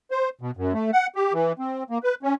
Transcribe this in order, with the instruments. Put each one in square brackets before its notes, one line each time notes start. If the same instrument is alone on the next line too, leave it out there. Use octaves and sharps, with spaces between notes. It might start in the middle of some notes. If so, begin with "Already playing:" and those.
[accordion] C5
B2
F#2
A3
F#5
G4
E3
C4
A#3
B4
C#4